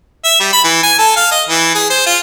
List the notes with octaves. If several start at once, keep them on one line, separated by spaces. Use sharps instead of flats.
E5
G3
B5
E3
G#5
A4
F5
D#5
E3
G#4
C5
F4